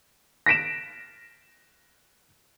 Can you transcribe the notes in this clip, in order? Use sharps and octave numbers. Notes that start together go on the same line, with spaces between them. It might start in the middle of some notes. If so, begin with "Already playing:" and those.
A#6 B6 D7 E7